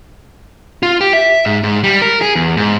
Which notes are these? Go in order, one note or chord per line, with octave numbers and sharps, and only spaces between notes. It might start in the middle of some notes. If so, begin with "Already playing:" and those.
F4
G4
E5
G#2
G#2
G3
A#4
G#4
E2
G#2